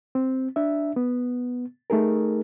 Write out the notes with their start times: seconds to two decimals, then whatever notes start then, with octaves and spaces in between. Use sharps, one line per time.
0.15 C4
0.56 D4 E5
0.96 B3
1.90 A3 D#4 G#4 A#4